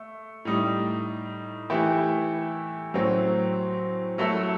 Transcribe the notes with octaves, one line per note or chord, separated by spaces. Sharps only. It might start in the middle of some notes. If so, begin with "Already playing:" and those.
Already playing: A3
A2 G3 D#4
E3 A3 E4 G4
A2 F#3 C4
F#3 A3 E4 A4